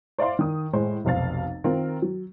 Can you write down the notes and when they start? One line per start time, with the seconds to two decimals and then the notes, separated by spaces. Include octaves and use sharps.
0.18 C5 D5 E5 F5 C6
0.39 D#3 D#6
0.73 A2 G#3 C5
1.05 F1 B1 C5 F5 A6
1.64 D#3 C4 F4 A#4
2.02 F#3